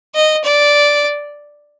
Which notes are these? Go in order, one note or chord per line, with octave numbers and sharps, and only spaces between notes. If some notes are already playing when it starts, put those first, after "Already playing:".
D#5
D5